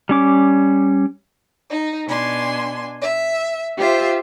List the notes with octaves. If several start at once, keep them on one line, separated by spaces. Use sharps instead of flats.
G3 C#4 D6
D#4
B2 D4 G#5 C6
E5
F4 G4 C5 E5